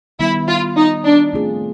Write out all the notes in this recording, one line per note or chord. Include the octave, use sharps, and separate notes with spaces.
D#3 G3 B3 E4
F4
D#4
D4
A3 C4 F4 G#4